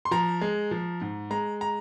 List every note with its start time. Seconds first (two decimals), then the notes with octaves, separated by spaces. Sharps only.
0.05 C6
0.11 F3 A#5
0.41 G#3
0.71 F3
1.01 G#2
1.31 G#3 A#5
1.61 A#5